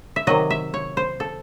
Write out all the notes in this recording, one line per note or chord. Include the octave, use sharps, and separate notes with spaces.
E5
C3 D#3 F#3 D#5
E5
C#5
C5
A4